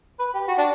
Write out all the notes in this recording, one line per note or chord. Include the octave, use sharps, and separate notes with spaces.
B4
G4
F#4
D4